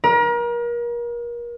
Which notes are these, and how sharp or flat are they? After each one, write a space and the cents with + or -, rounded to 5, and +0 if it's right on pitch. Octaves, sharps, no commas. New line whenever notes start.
A#4 +35